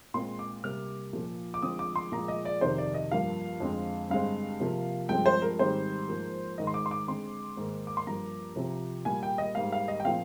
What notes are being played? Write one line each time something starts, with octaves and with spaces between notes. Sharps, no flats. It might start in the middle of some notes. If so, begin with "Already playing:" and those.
A#2 G#3 C4 C6
D6
C3 G3 A#3 F6
A#2 F3 A#3
D6
D3 F3 G#3 C4 D#6
D6
C6
A#2 F3 G#3 A#5
D#5
D5
F2 C3 D#3 C5
D5
D#5
G2 F3 A#3 F5
F2 D3 G#3 C4
G2 D3 G#3 C4 F5
C3 F3 A#3
G2 F3 G#3 C4 G5
C5
A#4
G#2 D#3 G3 C4 C5
G#2 F3 A#3
G#2 D#3 G#3 D#5
C6
D6
C6
D6
D3 G#3 C4 C6
G#2 D#3 A#3
D6
C6
G2 F3 A#3 A#5
C3 F3 C4
A#2 G3 A#3 G#5
G5
D#5
G#2 G3 A#3 F5
F5
D#5
G5
A#2 F3 C4 F5